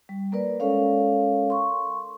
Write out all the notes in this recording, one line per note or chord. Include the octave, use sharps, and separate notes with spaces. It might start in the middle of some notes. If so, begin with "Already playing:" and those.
G3
A#3 A#4 B4 D5
G#3 C#4 A4 A#4 C#5 F5
C6 C#6